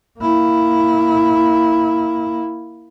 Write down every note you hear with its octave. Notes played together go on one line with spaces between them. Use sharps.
A#3 E4